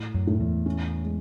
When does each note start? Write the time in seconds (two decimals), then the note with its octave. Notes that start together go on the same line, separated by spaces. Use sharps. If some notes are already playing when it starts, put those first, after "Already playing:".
Already playing: A2
0.14 F#2
0.27 A2
0.40 E2
0.66 C#4
1.04 G#3